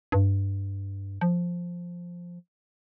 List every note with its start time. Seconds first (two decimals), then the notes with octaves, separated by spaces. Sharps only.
0.12 G2
1.21 F3